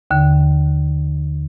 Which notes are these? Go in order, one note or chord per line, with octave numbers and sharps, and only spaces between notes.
D#2 D3